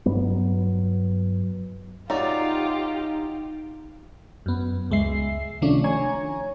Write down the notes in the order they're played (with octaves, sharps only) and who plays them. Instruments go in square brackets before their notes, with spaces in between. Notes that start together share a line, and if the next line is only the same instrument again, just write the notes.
[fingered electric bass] G2 F#3 B3
[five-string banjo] F#3 D5 [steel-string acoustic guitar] D#4 [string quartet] F4 G4
[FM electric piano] F#2 B3
C#2 G#3 E5 C7
C3 D#3 F3 A3 C#4 D4
C#5 G#5 A#5